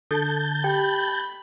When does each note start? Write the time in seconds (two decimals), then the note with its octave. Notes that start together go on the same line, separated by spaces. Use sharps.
0.11 D3 A4 A5 G6
0.64 G4 G5 B5